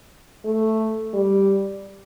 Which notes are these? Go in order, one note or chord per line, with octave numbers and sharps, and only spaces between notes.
A3
G3